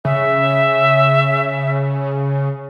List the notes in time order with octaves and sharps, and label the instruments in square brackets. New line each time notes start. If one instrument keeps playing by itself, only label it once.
[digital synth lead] C#3 [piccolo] E5